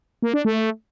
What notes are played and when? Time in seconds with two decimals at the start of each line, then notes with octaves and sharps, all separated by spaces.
0.22 A#3
0.34 D4
0.45 A3